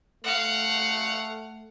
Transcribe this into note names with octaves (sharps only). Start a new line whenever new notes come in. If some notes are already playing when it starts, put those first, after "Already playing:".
A3 F5 F#5